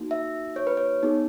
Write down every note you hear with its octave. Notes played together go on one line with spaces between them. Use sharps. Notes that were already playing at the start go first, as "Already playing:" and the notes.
Already playing: A#3 D#4 F#4
E5
C#5
B4
C#5
B3 D#4 G#4